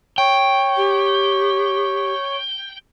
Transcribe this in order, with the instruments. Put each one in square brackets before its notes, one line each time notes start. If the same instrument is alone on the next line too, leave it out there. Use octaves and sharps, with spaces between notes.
[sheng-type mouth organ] C#5 [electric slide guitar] G5
[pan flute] G4